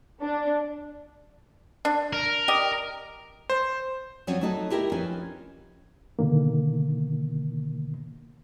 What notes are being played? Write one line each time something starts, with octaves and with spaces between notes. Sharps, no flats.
D4
D4
A#4
G4 D5 D#5
C5
F3 F#3 C4 C#4 C#5
F#3 A3 D#4 F#4 D#5
E4 G4 A#4 E5
F3 C4 C#4 D#4 B4 G#5
B2 D3 D#3 A#3